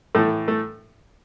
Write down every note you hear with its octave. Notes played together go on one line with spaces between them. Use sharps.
A2 E3 A3
A3